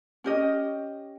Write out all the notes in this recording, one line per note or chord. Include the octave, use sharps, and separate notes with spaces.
C#4 G4 D#5